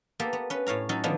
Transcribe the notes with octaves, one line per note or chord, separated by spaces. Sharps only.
A#3 B3 G4 A4
B3
C#4 B4
A2 C#5 F5 A#5
F#3 C#4 D#4 A4
D3 D#3 F3 B3 D4